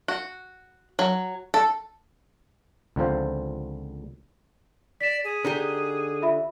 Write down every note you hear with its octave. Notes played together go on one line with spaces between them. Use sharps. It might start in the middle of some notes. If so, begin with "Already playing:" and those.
F#4
F#3
A4
C#2 D3 F3 C4 F4 C5
D5 B6 E7
G#4
D3 D#4 G4
F4 E5 B5